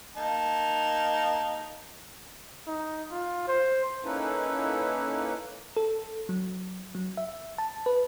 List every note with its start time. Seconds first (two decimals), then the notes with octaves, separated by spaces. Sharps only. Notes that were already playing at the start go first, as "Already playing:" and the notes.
0.16 A#3 D#4 A5
2.67 D#4
3.10 F4
3.48 C5
4.04 A#3 C#4 D#4 E4 A4 B4
5.77 A4
6.29 F#3
6.95 F#3
7.17 E5
7.58 A5
7.86 B4